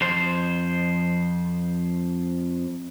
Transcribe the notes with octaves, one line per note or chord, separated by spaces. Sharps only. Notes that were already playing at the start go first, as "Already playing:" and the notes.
F2 C5